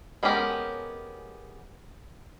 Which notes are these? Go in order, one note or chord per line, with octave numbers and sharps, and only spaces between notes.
G#3 B3 C#4 G4 A#4